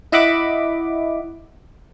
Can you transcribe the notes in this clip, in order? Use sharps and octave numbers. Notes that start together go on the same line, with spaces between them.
E4 D#5 E5 F#5 B5 D6